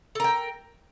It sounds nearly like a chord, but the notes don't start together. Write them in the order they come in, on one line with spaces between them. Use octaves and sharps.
A4 A#4 G5